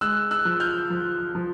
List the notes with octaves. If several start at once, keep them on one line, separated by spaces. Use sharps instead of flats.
G#3 E6 F#6
E6 F#6
F3
F6 G6
F3
F3